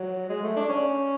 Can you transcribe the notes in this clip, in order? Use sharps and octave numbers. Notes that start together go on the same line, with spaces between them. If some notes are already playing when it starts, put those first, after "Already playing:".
Already playing: F#3
G#3
A3
D4
C#4